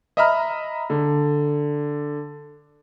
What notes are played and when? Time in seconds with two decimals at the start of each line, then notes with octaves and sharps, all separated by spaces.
0.17 D#5 E5 A#5 B5 F6
0.90 D3